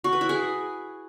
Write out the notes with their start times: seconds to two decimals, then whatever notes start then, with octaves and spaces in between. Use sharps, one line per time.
0.04 F#4
0.13 B4
0.21 E4
0.29 G#4